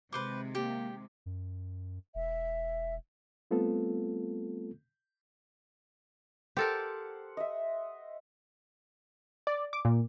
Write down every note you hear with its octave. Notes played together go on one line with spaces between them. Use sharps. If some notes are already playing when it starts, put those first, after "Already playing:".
C3 D#3 G#3 B4 C5 D6
A#3 G4
F#2
E1 E5
G3 A3 B3 C4 F4 A4
G4 A4 A#4 C5 F#5
D#5 E5
D5
D6
A#2